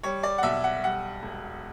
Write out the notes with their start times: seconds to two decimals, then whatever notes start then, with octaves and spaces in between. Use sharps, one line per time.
0.03 G3 C#5
0.23 D5
0.38 F#5
0.43 B1 E5
0.64 F#5
0.83 G3 F#5
1.23 E1